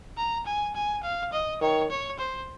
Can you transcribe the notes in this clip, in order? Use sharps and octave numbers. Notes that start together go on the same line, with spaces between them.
A#5
G#5
G#5
F5
D#5
D#3 C#5
C#5
C5